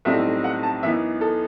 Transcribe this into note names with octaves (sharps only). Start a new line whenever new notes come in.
B1 A2 G3 C4 D#4 E5
F#5
A5
F#2 E3 B3 D#4 E5
A4